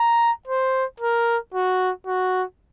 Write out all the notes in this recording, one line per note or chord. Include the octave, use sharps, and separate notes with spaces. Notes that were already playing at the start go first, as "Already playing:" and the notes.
Already playing: A#5
C5
A#4
F#4
F#4